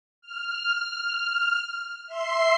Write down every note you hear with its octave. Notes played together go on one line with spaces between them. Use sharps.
F6
E5 C6 C7